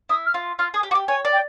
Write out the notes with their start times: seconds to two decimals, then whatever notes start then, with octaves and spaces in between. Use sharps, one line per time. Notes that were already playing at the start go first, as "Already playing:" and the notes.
0.09 E4 D#6
0.26 F6
0.34 F4
0.59 F4 F6
0.74 G#4 D#6
0.83 G4
0.91 F#4 D6
0.95 G4
1.08 C#5 G#5
1.25 D5
1.33 G5